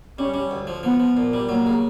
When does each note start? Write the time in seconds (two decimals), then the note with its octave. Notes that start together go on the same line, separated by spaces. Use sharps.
0.18 G3 C#4
0.34 G3
0.51 D2
0.67 F3
0.83 F3 B3
0.99 F3
1.17 A#2
1.33 G3
1.49 F#3 A#3
1.66 C#3